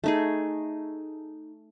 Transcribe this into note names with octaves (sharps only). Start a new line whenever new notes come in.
A3 D#4 G#4